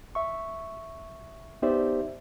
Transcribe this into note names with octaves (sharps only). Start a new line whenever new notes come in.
E5 C#6
B3 D#4 G4 C5 D5 E5